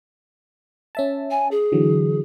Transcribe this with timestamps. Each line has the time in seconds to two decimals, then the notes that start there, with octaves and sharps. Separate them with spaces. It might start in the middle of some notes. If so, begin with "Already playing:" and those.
0.95 C#4 E5 A5
1.31 G#5
1.51 G#4
1.72 D3 E3 F#3